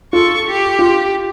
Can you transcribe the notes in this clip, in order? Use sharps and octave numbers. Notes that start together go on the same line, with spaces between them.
F4 A4 C#6
G4
F4